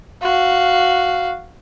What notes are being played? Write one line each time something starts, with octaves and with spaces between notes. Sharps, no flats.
F#4 F5